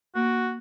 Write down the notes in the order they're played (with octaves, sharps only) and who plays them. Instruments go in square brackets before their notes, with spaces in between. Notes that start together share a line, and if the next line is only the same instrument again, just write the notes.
[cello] A#3 [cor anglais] F#4